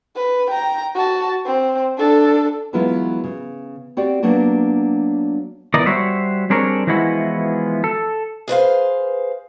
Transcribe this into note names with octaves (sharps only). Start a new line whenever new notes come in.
B4
G5 A#5
F#4 A5
C4
D4 A4
E3 F#3 G#3 B3 E4 F4
C#3
C4 F#4 G4 D5
F#3 A#3 B3 D4 F#4
E3 B3 E4 A#4 D5 D#5
G3 F#4 C5 C#5 E5
G3 C4 D4 G#4 A#4 C#5
E3 F3 G#3 B3 E4 F#4
A4
G#4 B4 C5 F5